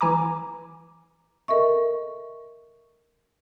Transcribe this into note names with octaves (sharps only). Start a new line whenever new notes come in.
E3 G#5 A#5 D6
A4 A#4 D#5 E5 C#6